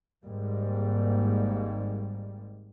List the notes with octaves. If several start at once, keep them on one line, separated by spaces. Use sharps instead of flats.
G#1 G#2 G3 A#3